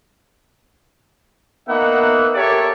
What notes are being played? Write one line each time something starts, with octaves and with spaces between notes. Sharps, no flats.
A#3 B3 D#4 E5 F#5
G4 A4 A#4 C#5 D5 E5